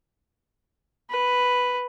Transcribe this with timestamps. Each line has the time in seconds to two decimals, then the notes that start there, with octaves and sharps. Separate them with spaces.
1.10 B4